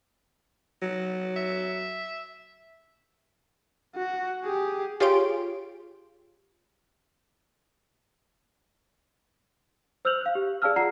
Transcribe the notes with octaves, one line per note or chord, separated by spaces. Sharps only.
F#3
E5
F#4
G4 G#4
F4 G4 G#4 C#5 C6 D7
C5 E6 F6 G6 F7 F#7
F5 F#6
G4
G#4 D5 F5 A5 E6 F6
F4 D5 F#5 A#5 C7